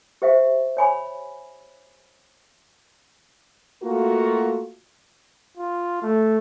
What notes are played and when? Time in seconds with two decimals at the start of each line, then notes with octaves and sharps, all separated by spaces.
0.22 G4 C5 E5 F5
0.77 C#5 G#5 B5
3.82 A3 A#3 F4 F#4
5.57 F4
6.03 A3